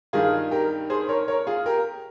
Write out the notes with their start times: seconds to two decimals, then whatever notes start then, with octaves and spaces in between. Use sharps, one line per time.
0.13 G2 D#3 F4 G#4
0.51 G4 A#4
0.90 G#4 C5
1.09 A#4 C#5
1.28 A#4 C#5
1.47 F4 G#4
1.66 G4 A#4